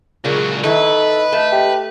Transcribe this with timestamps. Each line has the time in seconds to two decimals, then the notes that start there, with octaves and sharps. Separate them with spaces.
0.24 C#2 A#2 C#3 F#3 G#4
0.64 D#3 E4 A4 B4 D#5
1.32 A3 A5
1.53 G4